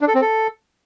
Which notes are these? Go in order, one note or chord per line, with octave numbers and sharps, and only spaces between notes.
D4
A4
C4
A4